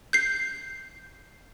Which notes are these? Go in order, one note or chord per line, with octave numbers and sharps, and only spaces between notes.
G6 C7